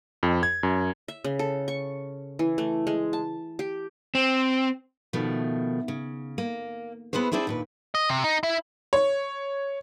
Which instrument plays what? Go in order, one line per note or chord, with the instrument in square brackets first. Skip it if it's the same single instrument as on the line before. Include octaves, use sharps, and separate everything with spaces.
[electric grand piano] F2
G#6
F#2
[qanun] E5
C#3
A4
C#6
E3
A3
G#3
A5
G4
[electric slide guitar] C4
[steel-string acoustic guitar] B2 D#3 F3 A3
C#3
A#3
B3 E4 G#4 B4 C5
C4 D4 E4 G#4 C5
D#2 A#2 B4
[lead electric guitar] D#5
C3
D#4
E4
[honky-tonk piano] C#5